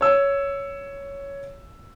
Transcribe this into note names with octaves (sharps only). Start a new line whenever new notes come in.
C#5 E6